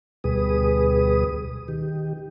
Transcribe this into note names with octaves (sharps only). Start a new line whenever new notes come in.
D2 B2 G3 G#4 B4 D#6
D#3 G4